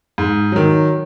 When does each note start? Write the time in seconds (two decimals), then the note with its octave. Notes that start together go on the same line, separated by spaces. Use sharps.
0.18 G#2
0.52 D#3 F#3